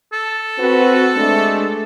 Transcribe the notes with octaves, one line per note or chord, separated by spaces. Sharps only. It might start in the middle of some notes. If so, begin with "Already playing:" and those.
A4
C4 F#4 B4
G#3 A3 D4